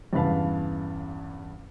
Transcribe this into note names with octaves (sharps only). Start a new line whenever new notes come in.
E2 G2 C#3 B4 F5 A5